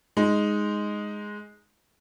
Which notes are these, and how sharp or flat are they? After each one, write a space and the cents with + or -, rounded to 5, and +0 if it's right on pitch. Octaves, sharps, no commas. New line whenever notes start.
G#3 +0 D#4 +0